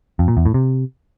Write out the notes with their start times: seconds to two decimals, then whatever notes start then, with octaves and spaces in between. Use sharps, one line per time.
0.19 F2
0.28 A#2
0.37 E2
0.46 A2
0.54 C3